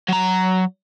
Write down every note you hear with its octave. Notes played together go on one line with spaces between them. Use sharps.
F#3 A#5